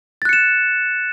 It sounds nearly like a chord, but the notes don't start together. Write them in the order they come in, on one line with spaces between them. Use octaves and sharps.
A6 F#6 C#7 E7